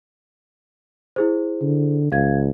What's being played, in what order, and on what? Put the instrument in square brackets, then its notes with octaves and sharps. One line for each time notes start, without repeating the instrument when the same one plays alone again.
[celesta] E4 G#4 C5
[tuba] D3
[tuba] C#2 [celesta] F5 G#6